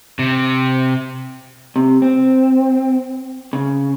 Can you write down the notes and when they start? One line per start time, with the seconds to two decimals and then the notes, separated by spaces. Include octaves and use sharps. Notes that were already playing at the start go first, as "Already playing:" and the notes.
0.19 C3
1.76 C3
2.02 C4
3.53 C#3